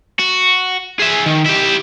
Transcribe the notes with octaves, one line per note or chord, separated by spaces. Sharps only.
F#4
G#4 E5
D#3
E4 G4